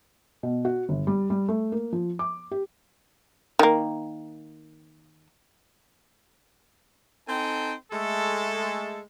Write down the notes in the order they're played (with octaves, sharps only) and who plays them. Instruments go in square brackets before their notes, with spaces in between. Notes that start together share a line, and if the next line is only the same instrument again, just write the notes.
[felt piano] B2
F#4
G1
G3
G3
A3
A#3
F3
D6
G4
[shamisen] D#3 A#3
[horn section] C4 D#4 A4 C5 G5 G#5
G#3 A3 A4